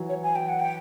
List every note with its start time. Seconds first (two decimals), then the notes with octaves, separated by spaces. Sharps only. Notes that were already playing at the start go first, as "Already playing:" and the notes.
Already playing: E3 F#3
0.09 C#5
0.23 G#5
0.36 G5
0.48 F#5
0.60 G5